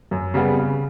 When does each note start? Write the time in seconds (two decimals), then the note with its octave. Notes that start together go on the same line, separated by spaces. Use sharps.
0.11 F#2
0.34 C#3 G3 B3
0.57 C#3